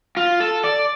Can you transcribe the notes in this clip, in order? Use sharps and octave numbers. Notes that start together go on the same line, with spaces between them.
F4
A4
D5